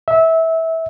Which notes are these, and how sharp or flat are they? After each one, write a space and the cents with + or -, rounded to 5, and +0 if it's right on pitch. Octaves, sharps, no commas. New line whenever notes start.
E5 -20